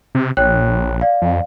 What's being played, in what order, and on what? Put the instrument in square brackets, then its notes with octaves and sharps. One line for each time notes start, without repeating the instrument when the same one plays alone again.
[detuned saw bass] C3
[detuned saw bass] A#1 [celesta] C#5 G5 F#6
[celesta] D5 F5
[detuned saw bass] F2